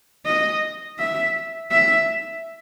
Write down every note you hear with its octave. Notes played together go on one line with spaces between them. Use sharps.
D#5
E5
E5